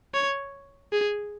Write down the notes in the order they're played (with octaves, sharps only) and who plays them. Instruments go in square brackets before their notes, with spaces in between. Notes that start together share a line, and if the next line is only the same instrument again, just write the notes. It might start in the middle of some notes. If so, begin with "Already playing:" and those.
[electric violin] C#5
G#4